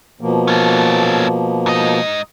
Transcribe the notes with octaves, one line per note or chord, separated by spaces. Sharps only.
B2 F3 A#3
C#4 A4
G#2 D#5